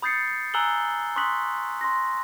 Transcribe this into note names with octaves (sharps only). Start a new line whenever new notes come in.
B5 D#6 G6 A6 C7 C#7
G#5 A#5 E6 F#6 F#7 G7
C6 C#6 D#6 F#6 B6 F#7
C6 A#6